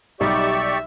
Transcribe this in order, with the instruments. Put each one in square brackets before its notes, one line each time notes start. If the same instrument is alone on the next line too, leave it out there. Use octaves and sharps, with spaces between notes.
[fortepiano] B1 G3 D#4 [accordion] G4 D5 C#6 [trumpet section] E5